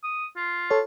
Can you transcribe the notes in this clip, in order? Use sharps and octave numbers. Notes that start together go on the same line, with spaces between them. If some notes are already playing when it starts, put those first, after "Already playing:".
D#6
F4
A4 C#5